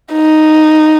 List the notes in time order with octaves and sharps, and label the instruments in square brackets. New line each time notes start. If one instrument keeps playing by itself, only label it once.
[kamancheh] D#4